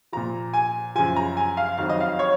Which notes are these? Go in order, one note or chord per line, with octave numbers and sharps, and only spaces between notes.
A#2 F3 A#5
G#5
F#2 C#3 F3 G#5
A#5
G#5
F5
F2 D#3 F#3 F5
D#5
F5
C#5